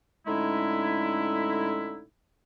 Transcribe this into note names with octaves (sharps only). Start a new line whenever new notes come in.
A2 D3 G#3 C#4 D#4 E4